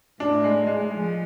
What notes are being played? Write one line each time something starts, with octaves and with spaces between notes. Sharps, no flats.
A2 D4
G#3
G#3
F3 G#3